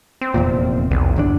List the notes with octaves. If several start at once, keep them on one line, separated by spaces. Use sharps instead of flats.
C4
F1 E2 A#2
B1 E2
G1 E2 D4